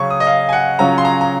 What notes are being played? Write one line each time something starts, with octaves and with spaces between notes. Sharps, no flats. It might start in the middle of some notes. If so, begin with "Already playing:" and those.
Already playing: C#3 F#3 C#4 C#6
D#6
D#5
F5
G#5
F#5
C#3 F#3 C#4 F4 A#5
C6
A#5
A#5